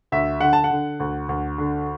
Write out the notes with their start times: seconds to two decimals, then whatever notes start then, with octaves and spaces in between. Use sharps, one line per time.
0.12 D2 E5
0.41 D3 F#5
0.53 A5
0.64 F#5
0.71 D3
1.00 D2
1.29 D2
1.58 D3